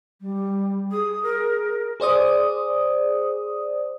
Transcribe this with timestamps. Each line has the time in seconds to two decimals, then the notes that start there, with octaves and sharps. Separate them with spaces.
0.21 G3
0.92 G#4 D#6
1.23 A#4
2.00 G#4 C5 D5 D#6